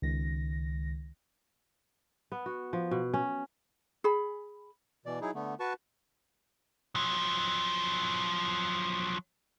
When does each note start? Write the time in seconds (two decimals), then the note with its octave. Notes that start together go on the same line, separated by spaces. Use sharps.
0.02 C#2 D#3 A#6
2.32 B3
2.46 F#4
2.73 F3
2.91 B2
3.14 C#4
4.04 G#4 B5
5.06 B2 E3 D5
5.21 F#3 D#4 E4 G#4
5.35 D3 A3 B3
5.60 F#4 B4 A5 C#6
6.95 F3 F#3